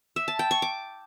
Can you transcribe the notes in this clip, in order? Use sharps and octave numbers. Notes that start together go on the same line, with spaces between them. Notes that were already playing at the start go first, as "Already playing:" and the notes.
E5
A5
G5
C#6
D6